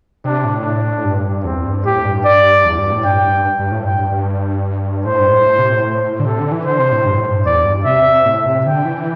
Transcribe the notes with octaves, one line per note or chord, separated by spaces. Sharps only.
C3 D4
A2
D4
G2
E2 C4
E2
G2
A2 G4
G2
D5
E2
G2
A2
G2 G5
G2
G2
A2
G2 G5
G2
G2
A2 C5
G2
A2
A2
C3
A2
D3
C3 A4
D3
E3
D3 C5
C3
A2
G2
A2
G2
E2 D5
G2
C3 E5
A2
C3
D3 G5
E3